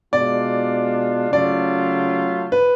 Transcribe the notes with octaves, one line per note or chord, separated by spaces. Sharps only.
B2 G#3 D4 F4 D5
C#3 F#3 A3 F4 D5
B4